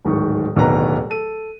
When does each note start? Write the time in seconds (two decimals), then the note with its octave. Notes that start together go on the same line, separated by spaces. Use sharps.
0.05 D1 G#2 D#3 C#6
0.56 D1 D#2 B2 D4 B4 A#5
1.10 A4 D#7